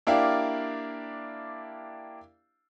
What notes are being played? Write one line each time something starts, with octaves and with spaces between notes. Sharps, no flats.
A#3 D4 E4 G4 D5 F5